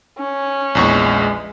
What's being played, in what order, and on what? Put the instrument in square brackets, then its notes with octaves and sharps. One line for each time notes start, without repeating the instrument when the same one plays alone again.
[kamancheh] C#4
[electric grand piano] A#1 E2 C#6 [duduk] G#3